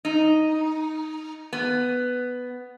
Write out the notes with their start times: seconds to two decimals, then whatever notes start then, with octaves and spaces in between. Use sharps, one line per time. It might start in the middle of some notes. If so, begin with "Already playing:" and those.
0.05 D#4
1.53 B3